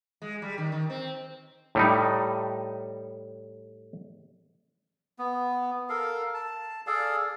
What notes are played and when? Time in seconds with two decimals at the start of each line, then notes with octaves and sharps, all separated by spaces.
0.22 G#3
0.42 G3
0.58 D#3
0.72 D#3
0.90 C4
1.75 A2 G3 D#4
5.19 B3
5.89 A4 A#4 F5
6.34 A5
6.87 G#4 A4 D5 F5